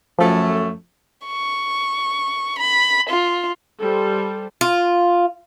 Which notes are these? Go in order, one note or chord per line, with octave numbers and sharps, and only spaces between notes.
F#2 F3 A3
C#6
B5
F4
G3 A4 C5
F4